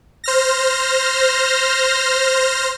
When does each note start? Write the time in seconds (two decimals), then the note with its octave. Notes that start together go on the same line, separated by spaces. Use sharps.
0.24 C5 F6 A#6